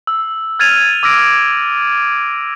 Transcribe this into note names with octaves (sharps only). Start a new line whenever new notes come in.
E6
F6 G#6 A6 D#7 F7
D6 E6 F6 A#6 D7